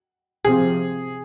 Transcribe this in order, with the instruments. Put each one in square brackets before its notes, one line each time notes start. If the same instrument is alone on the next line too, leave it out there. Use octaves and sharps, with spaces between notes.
[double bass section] C3 F3 C4 [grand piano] G#4